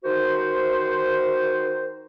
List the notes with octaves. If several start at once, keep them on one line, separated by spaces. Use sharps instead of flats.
D#3 D#4 F#4 C5